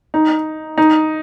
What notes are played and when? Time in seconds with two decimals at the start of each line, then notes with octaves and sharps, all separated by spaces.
0.14 D#4
0.78 D#4